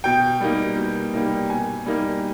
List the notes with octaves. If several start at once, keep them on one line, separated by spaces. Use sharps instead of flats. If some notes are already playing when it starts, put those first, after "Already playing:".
B2 G5
G3 A#3 D#4
B2
G3 A#3 D#4
B2 G#5
G3 A#3 D#4